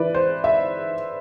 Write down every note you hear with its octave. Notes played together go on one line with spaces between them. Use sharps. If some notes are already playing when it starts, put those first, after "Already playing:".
Already playing: E3 E4 B4 D5
C5
E5